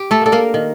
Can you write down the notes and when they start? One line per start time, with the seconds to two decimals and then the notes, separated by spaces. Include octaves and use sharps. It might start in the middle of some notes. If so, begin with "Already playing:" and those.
Already playing: G4
0.11 A3 A4
0.22 A#3 D4 A4
0.32 A#3 A#4
0.54 D#3